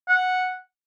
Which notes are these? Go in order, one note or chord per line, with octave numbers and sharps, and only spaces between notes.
F#5